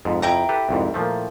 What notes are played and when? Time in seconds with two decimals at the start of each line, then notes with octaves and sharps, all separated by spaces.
0.05 F2 G#2
0.22 F2 E4 G5 A#5
0.49 G4 A4 B4
0.69 C2 F2 G#2
0.94 A#2 F3 A3